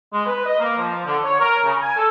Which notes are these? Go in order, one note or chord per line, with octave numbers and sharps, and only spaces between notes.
G#3
B4
D#5
A#3
F3
D3
C#5
A#4
C#3
G#5
A4